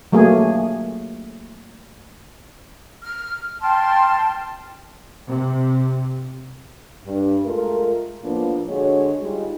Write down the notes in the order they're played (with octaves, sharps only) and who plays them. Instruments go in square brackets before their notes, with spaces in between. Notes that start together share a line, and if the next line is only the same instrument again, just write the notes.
[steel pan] F#3 A3 A#3 G#4
[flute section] F6
G5 A5 C6 F6
[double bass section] C3
[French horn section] G2
G#3 A3 F4 A#4
A2 F3 A#3 B3 D4 F4
D3 G#3 F#4 G#4 C#5
G3 G#3 D#4 F4